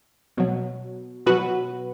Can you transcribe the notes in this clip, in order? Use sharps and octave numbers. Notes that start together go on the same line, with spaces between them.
B2 F#3
B2 F#3 F#4 B4